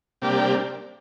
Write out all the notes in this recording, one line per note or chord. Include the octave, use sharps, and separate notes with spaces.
C3 G3 A#3 D4 G4